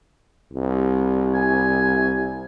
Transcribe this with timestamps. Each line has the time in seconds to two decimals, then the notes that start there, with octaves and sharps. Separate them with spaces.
0.53 C2
1.34 G#5